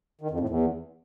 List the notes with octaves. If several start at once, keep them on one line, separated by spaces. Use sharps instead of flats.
D#3
F2
A2
E2